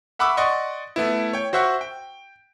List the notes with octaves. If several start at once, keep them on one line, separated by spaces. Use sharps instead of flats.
E5 F#5 B5 C#6 D6 E6
D5 D#5 F#5 C6 C#6
A3 B3 E4
C#5 G5
F#4 C5 E5 F#5 C#6
G5